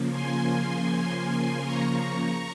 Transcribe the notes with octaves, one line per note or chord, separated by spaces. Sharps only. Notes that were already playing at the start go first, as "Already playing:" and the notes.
Already playing: C#3 F3 A#3
G#5 C6
A#5 C#6